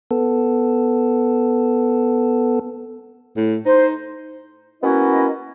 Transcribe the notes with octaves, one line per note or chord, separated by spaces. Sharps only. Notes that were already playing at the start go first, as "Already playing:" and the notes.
B3 A4
A2
D#4 C5
A#3 B3 C#4 E4 F#4 D#5